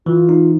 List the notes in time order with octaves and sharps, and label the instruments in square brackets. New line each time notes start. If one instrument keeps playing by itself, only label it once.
[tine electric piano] E3 [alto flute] F4
[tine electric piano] D#4